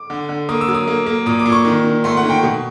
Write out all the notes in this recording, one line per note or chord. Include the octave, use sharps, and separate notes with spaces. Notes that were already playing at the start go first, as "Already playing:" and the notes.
Already playing: D6
D3
D3
A#3 D#6
E6
F#3
D#6
A#3
A#3
A#2 D#6
D6
A#2
C#6
D#3
D#3
A3 C6
F#5
D#3
G5
B2